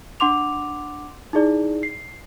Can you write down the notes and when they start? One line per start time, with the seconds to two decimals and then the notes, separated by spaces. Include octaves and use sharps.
0.20 D4 F#5 C6 D6 F7
1.33 D#4 E4 G#4 D5
1.83 C7